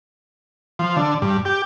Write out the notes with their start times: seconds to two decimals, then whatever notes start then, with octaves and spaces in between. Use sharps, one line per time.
0.79 F3
0.97 D3
1.22 G2
1.45 G4